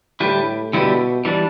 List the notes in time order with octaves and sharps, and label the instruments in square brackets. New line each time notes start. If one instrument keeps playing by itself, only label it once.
[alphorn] A2 [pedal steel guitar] D3 G3 E4 G4 B4
[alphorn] B2 [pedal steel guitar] D3 G3 E4 G4 B4
[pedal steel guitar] E3 G3 D4